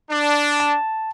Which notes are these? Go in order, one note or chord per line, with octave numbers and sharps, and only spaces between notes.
D4
A5